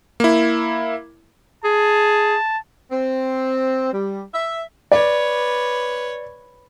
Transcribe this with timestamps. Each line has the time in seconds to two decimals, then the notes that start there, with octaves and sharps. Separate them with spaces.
0.20 A#3 E4
1.64 G#4 A5
2.91 C4
3.92 G3
4.34 E5
4.92 B4 C#5 D5